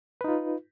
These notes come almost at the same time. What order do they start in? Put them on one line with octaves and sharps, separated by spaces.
B4 D#4 F4